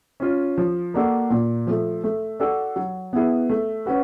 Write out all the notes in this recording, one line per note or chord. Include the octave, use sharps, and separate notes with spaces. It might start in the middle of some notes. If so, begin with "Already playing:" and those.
C#4 F4
F3
A#3 D4 F#4 A4
A#2
F3 A3
A3
D4 F#4 A4
F#3
B3 E4 G#4
A3
C#4 F#4 B4